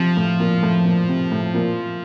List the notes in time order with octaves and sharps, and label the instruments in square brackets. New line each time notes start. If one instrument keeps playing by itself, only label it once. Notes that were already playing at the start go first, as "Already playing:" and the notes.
Already playing: [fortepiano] C3 [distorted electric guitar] F3
[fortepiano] A2
A#2
A2
A#2
C3
A2
A#2